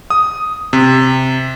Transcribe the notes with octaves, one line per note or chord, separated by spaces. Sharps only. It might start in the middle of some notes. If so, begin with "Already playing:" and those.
D#6
C3